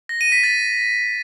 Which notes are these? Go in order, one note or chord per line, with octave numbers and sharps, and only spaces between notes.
A#6
D#7
B6
A6